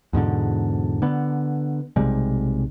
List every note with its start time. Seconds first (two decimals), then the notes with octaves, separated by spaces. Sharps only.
0.13 E2 G#2 B2 D3
1.02 D3 B3
1.96 B1 C3 G3 G#3